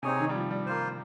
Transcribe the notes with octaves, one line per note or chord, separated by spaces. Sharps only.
C3 C4 D#4 G#4 C#5 G#5
D#3
G3
F3
G3
A#3 F4 C5